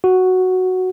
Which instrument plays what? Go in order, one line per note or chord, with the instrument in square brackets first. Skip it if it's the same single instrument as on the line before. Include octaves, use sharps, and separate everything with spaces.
[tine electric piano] F#4